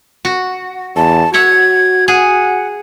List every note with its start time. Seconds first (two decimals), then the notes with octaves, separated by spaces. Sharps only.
0.25 F#4
0.96 E2 A5
1.34 F#4 C#5 E5 F#5 G#6
2.08 G#4 F#5